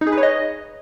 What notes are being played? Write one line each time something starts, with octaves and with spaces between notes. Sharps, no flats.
D#4
G#4
B4
C#5
D#5